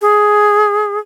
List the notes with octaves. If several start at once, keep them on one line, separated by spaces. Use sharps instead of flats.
G#4